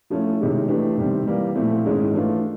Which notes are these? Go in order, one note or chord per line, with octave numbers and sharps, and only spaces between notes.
F3 A3 C#4 E4
C3 D#3 G#3 C#4 E4
E3 A3 D4 G4
C3 D#3 G3 C4
E3 G3 A#3
A#2 F3 A3 C4 E4
G#2 D#3 G#3 C#4 E4
E3 A3 D4 F4